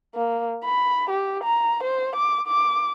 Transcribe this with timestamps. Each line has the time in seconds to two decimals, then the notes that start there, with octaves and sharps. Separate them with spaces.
0.15 A#3
0.64 B5
1.10 G4
1.44 A#5
1.83 C5
2.16 D6
2.47 D6